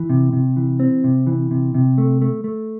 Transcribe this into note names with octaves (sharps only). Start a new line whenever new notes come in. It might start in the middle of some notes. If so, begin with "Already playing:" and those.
Already playing: E3
C3
C3
E3
C4
C3
E3
C3
C3
A3
A3
A3